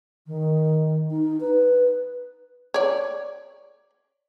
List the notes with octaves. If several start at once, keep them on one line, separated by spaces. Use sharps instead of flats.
D#3
D#4
B4
C#5 D5